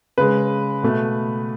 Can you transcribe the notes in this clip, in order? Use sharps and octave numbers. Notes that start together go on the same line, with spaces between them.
C#3 G#3 B4
B2 A3